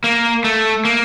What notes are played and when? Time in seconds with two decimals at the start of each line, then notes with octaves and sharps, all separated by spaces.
0.04 A#3
0.44 A3
0.85 A#3